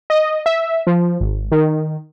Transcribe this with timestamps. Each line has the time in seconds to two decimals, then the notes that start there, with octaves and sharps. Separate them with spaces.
0.10 D#5
0.46 E5
0.87 F3
1.21 G#1
1.52 D#3